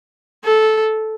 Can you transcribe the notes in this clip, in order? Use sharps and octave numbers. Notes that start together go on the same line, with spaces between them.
A4